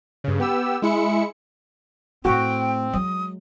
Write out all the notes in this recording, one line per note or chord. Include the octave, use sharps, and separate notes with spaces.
G2 C#3
B3 G4 E6
G#3 E4 C#7
A2 A3 C4 F#4 G5
F#3 G#3 D#6